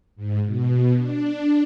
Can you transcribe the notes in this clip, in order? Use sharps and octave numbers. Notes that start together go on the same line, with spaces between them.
G#2
B2
D4